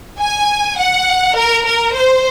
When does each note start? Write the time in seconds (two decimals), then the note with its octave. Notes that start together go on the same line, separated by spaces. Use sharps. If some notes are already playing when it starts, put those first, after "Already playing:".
0.20 G#5
0.78 F#5
1.36 A#4
1.65 A#4
1.94 C5